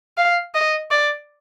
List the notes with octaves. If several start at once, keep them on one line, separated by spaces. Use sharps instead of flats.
F5
D#5
D5